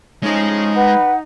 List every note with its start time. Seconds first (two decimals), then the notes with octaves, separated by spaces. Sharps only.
0.23 A2 F3 G#3 C#4 D#4 D#5
0.76 B4 F#5